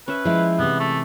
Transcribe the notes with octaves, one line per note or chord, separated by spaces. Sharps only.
C#4 B4 E5
F3 G#3 E4
C3 E3 B3
A3